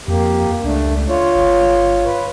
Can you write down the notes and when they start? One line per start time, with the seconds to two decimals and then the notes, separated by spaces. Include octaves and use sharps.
0.08 F2 A#3 G4
0.64 C#2 A3 D4
1.09 F4 C#5
1.35 G1
2.05 B4